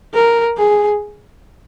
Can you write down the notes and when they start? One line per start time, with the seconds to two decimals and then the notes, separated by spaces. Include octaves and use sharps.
0.14 A#4
0.58 G#4